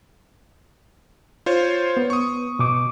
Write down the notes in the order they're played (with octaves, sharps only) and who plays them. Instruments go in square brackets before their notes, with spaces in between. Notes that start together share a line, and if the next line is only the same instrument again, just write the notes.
[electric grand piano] F4 C5 C#5
[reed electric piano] B3
[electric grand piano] C#6 D#6
[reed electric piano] B2 D6